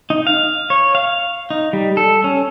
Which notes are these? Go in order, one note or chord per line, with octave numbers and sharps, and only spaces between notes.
D#4
F5
C#5
F5
D#4
G3
A4
C#4